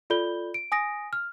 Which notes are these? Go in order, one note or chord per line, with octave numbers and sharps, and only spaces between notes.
F4 A4 D5 B5 G6 G7
D7
G#5 D#6 A#6 D7
F6